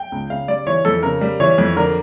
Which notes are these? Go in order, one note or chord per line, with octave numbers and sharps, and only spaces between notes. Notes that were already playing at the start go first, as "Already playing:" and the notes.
Already playing: G5
C#2
C#3 F5
G3 D5
E3 C#5
F2 A4
C#3 A#4
G3
E3 C#5
F2
D3 A#4